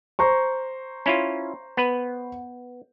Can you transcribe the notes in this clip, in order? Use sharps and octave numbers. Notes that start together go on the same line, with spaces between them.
C5 A#5 C#6
C#4 E4 F4
B3 B4